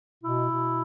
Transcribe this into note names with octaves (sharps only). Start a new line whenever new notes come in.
B2 E4
B2